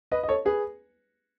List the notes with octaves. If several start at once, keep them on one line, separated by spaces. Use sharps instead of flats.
B4 D#5
D#5
A4 C#5
G#4 B4